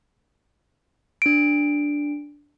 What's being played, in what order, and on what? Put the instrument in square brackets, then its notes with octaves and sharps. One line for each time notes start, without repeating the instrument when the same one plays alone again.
[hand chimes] D4 D7